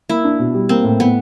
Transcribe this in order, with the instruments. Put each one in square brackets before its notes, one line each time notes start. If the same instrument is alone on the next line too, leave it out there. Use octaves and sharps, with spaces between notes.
[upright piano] A#3 [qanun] E4
[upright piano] D4
B2
G3
[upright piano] A#3 [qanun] C4
[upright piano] A2
[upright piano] A2 [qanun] B3